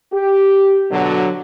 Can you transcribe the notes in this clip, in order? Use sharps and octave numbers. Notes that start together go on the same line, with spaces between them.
G4
B2 D3 F#3